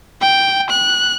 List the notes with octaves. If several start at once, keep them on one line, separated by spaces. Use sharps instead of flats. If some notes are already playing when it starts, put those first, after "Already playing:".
G5
F#6